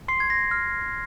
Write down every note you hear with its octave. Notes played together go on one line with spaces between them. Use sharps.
C6 C7
G#6
A#6
F6